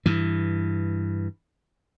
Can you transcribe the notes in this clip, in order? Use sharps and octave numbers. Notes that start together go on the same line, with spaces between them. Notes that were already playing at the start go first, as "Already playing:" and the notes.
G2 E3